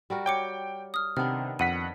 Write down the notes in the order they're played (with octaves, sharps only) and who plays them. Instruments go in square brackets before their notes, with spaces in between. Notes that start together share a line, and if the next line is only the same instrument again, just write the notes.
[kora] G3 F#4 A#4
[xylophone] C#5 D6 C#7 [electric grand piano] G5
[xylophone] D#6 F6
[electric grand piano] C3 [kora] D#3 B3 D4 [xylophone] F6
[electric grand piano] F2 F#5 B6 [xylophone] D#7